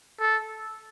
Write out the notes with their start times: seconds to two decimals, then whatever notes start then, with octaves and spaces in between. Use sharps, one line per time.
0.20 A4